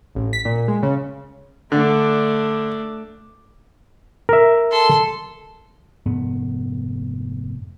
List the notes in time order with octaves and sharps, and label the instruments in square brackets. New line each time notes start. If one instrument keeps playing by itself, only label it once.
[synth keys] A1
B6
A#2
G#3
C#3
[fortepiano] D3 [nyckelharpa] A3 D4
[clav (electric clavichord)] A#4 E5
[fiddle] A4 C6
[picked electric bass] F1 G#2 B3